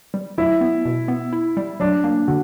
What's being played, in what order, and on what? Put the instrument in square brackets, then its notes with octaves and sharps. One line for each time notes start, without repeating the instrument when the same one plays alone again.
[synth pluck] G3
[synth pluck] F#3 [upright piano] E4
[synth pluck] B3
B2
B3
E4
G3
[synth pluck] F#3 [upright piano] D4
[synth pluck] A#3 [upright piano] D4
[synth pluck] D3 [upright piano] F#4